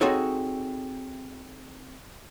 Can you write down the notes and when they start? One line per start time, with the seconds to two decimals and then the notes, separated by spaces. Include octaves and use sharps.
0.01 C4 D#4 F#4 G#4 A4 C#5